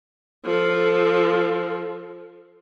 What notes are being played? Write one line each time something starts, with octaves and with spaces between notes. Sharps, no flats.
F3 A4